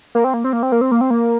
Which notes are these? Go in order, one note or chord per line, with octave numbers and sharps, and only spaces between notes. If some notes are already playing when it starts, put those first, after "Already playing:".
A#3
C4
A#3
C4
A#3
C4
A#3
C4
A#3
C4
A#3